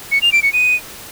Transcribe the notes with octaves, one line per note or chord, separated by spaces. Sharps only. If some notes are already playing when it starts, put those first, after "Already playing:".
C#7
F7
D7
C#7
D#7